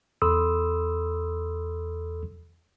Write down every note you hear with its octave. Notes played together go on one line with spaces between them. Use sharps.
E2 A4 B5 C6 D#6 E6